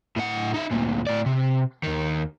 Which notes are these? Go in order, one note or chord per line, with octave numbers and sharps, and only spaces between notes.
A2 F#5
D#4 E5
D2 A#2
A2 D5
C3
D#2 D#3